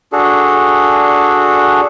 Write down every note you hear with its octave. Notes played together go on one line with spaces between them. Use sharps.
D4 F#4 G#4 A4